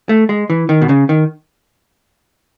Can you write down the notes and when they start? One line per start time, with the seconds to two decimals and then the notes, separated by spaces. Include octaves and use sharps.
0.09 A3
0.29 G#3
0.50 E3
0.69 D#3
0.82 B2
0.89 C#3
1.09 D#3